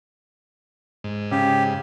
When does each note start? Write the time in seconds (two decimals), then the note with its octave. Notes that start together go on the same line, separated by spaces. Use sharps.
1.04 G#2
1.31 C#3 G4